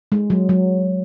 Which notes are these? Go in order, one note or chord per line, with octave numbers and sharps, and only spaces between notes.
G#3
F#3
F#3